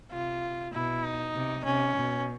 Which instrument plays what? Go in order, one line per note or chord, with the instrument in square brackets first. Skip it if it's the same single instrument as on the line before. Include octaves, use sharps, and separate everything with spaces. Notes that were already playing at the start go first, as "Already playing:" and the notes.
[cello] C3 [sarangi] F4
[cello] B2 [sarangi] E4
[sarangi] D#4
[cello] C3
[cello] C3 [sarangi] C#4
[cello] B2